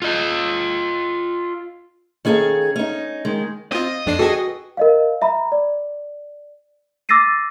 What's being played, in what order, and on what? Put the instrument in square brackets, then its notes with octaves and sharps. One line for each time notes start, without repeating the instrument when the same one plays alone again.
[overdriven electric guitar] F4 D#5
[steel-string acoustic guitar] D#3 C#4 G#4 A4 F5
C#4 D#4
D#3 G#3
[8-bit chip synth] C4 F4 [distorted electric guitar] D#5
[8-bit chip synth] F2 D4 C7
[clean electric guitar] F#4 B4 G5 [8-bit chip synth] G#4 A4
[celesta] A#4 D#5 F5
E5 A#5 B5
D5
D6 E6 A6 A#6 C7 D#7